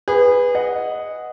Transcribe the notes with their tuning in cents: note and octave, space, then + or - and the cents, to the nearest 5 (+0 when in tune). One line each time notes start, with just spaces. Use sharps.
G#4 -25 B4 +0
D#5 +0 F#5 -5